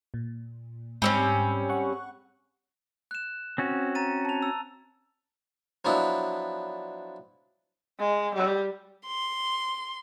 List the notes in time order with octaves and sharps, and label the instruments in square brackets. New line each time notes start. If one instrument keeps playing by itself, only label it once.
[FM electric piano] A#2
[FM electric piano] G#2 G4 [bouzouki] G3 C4 C#4
[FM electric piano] F#5 C#6 F#6
[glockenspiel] F#6 E7
[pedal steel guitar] C4 C#4 F#4
[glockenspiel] A#5 A6 D#7
A5 F7
E6
[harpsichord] F3 F#3 B3 D4 E4
[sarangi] G#3
G3
[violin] C6